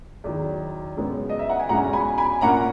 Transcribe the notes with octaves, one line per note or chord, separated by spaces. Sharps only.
E2 D#3 F#3
F#2 C#3 G#3 B3
D#5
E5
F#5
G#5
E2 B2 G#3 C#4 F#5 A#5
G#5 B5
G#5 B5
A#2 A#3 C#4 F#5 A#5